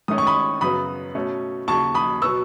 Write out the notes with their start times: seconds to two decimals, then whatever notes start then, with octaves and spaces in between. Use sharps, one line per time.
0.08 G#2 D#3 A3 C#4 D#6
0.18 C#6
0.27 B5 D#6
0.61 F#2 C#3 F#3 B3 B5 D#6
1.15 B2 A3 C#4
1.68 D#2 C#3 F#3 A5 C#6
1.94 B5 D#6
2.22 B2 F#3 B3 C#6 E6